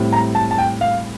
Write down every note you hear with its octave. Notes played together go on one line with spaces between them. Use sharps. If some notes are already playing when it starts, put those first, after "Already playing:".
Already playing: A2 G3 C4
A#5
A5
A5
G5
F5